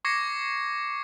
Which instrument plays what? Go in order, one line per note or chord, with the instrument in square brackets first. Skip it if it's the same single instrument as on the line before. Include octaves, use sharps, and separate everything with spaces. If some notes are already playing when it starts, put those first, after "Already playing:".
[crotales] C#6 D6 G#6 A#6 C7 C#7